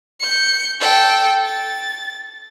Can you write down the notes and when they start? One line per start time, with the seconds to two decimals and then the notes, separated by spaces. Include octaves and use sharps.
0.20 G6 C#7
0.81 A4 G5
1.45 A6